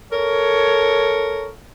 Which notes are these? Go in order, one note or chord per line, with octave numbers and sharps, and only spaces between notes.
A4 A#4 C#5